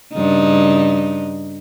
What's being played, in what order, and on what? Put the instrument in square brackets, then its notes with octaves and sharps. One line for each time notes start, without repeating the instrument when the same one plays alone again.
[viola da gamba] G2 C#3 D#4